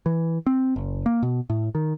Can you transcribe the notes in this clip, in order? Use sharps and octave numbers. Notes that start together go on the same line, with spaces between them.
E3
C4
F#1
A#3
B2
A2
D#3